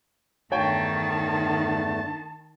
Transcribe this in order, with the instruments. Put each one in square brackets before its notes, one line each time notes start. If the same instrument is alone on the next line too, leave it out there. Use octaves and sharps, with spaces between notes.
[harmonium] E2 G2 A3 [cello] D#3 [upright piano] C#5 G5 [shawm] A5